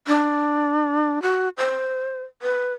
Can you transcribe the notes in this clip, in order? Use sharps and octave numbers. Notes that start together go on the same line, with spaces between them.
D4
F#4
C5
B4